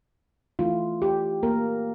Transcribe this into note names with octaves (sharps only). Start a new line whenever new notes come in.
E3 A3 E4 F4
G4
A#3 A#4